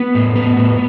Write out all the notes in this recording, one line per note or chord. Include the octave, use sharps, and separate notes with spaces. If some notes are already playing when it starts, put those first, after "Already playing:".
Already playing: B3
A2
B3
A2